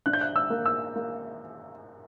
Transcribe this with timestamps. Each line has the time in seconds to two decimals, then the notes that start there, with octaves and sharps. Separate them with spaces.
0.06 D4 F#6
0.13 G6
0.21 F#6
0.36 E6
0.50 A#3
0.66 E6
0.96 A#3